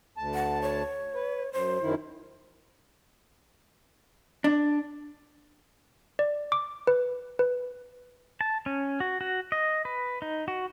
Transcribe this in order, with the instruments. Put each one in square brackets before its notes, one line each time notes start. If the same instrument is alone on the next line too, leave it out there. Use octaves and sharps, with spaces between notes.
[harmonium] D2 A5
[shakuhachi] F#5
C#5
[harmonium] B4
[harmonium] F#2 [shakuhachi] C5
[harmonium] F#2 D#3 E4
[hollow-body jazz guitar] D4
[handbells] D5
D6
B4
B4
[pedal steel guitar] A5
C#4
F#4
F#4
D#5
B4
D#4
F#4